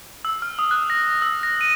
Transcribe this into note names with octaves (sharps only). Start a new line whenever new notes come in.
E6
F6
D#6
F#6
A#6
E6
A#6
D#7